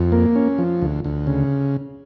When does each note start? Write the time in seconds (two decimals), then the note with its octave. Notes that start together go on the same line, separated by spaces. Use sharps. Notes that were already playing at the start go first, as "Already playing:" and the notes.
Already playing: F2
0.12 A#3
0.36 C#4
0.59 F3
0.82 D2
1.04 D2
1.27 C#3